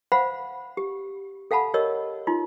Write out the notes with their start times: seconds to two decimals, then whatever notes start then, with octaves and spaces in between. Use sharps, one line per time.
0.12 C5 F5 F#5 B5
0.77 G4
1.51 A4 F5 F#5 A5 B5
1.74 G4 A#4 C#5 D#5 E6
2.27 D#4 F4 C6